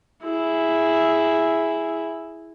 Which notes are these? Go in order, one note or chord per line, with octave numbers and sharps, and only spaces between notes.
E4 G#4